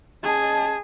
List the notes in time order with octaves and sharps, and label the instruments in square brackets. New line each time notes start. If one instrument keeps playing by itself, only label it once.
[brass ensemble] C#4 D#5 A5 [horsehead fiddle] G#4